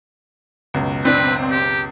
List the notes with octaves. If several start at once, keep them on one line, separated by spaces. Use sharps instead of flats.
C#2 F#2 B2
C4 D4 B4
G4